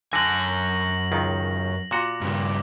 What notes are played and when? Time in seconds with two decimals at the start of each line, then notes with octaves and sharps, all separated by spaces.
0.13 F#2 D3 G#5 A#6 F#7
1.12 C#2 D#3
1.91 A#2 F#4 D6
2.21 G2 C#3